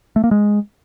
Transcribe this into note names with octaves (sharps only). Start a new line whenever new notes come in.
A3
A#3
G#3